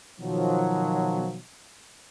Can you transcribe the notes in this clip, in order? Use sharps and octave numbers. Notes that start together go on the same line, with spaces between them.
B2 D#3 F3 F#3